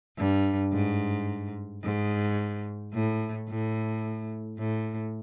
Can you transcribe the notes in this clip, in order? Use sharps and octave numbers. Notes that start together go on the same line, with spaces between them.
G2
G#2
G#2
A2
A2
A2